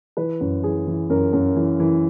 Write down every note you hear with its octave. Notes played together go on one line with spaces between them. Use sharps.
E3 B4
F#2
E3 G#4
E3
F#2 A#4
F#2
E3
E3